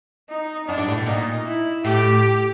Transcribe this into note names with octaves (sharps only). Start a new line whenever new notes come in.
D#4
F#2 D4
G2
A2
B2
A#2 D#4
E4
A2 G4